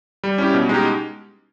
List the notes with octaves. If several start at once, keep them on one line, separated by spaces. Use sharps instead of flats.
G3
C#4 E4 G4
B2
G#3 D#4 G4